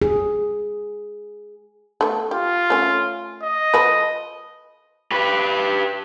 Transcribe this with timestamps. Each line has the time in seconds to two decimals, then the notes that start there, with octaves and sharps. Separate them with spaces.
0.02 G#4
2.01 A3 B3
2.31 F4 G4
2.70 A3 C#4
3.43 D#5
3.74 F3 A4 B4
5.11 G4 B4